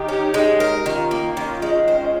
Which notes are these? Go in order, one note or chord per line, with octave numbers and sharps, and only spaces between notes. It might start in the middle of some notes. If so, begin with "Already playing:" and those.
Already playing: D#3 D#4 G4
C#4
G#3
A#4
D#3 C#4 F4
A#3
D#3 C#4 F4
G#3
C#4 F4 C5